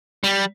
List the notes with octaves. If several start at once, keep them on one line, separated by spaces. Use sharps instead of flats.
G3